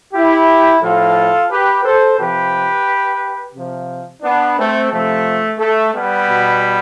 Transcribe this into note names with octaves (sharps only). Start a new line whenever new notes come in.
E4 G4
A2 F3 F4 A4
G4 B4
A4 C5
C3 F3 G4 B4
C3 F3
B3 D4
A3 C4
C3 F3 A3
A3
G3 B3
B2